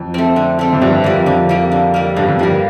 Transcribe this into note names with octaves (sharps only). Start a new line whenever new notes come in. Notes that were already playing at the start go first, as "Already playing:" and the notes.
Already playing: F2
A3 C4
D3
A3 C4
F2
G2 D3
F2 G3 A#3
F2 D3
G3 A#3
D3
G3 A#3
G2 D3
F2
G2 G3 A#3